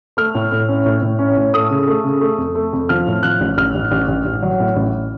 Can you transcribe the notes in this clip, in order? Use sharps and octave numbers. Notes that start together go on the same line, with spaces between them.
A3 F6
A2
A2
C#4
A2
A2
C#4
A2
A3 D#6
C#3
A3
C#3
A3
F2
A3
F2
F3 F6
A2
F3 F#6
A1
A1 F6
A1
A1
A1
A1
F#3
A2
A1